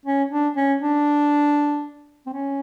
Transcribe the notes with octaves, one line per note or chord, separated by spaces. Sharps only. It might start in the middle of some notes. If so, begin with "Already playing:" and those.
C#4
D4
C#4
D4
C4
C#4